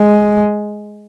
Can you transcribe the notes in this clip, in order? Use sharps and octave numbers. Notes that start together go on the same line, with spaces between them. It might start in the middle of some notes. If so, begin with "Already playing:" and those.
Already playing: G#3